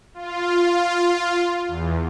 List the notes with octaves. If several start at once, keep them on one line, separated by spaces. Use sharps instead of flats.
F4
E2